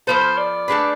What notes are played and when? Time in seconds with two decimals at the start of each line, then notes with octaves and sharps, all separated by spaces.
0.07 F3 B3 F4 A4 C5
0.38 D5
0.68 A3 D4 G#4 B4